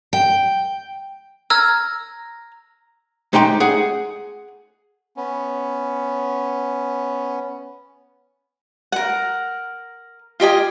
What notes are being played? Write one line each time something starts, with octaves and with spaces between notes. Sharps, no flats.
G5
A#5 E6 F6 G#6
G#3 D#4 G4 G5 C6
G#4 F#5
B3 C#4
A#4 F#5
F4 G4 D#5 G#5